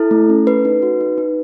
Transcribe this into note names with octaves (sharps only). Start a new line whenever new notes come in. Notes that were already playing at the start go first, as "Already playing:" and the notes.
Already playing: E4 A4
A3
C#4
A4 B4
D#4
F#4
D#4
D#4